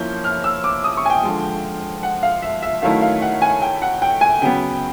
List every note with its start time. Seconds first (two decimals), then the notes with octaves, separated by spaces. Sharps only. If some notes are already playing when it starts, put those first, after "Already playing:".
Already playing: F3 A#3 C#4 E4 G6
0.24 F6
0.44 E6
0.64 D6
0.84 D#6
0.97 C#6
1.05 G#5
1.10 G5
1.23 D3 F3 G#3
2.03 F#5
2.23 F5
2.42 E5
2.63 E5
2.82 D#3 F#3 A3 C#4 E4 F5
3.02 F5
3.22 F#5
3.42 G#5
3.62 G5
3.82 F#5
4.02 G5
4.21 G#5
4.42 C#3 F#3 B3 G5